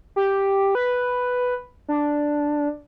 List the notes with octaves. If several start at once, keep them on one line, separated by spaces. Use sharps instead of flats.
G4
B4
D4